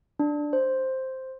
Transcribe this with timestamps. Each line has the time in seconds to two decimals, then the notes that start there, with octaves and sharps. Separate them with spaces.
0.19 D4
0.53 C5